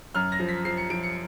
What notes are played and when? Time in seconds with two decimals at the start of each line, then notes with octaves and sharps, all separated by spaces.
0.15 F#2 F6
0.32 A#6
0.40 F3
0.48 B6
0.65 F3 C7
0.77 C#7
0.90 F3 D7
1.03 C#7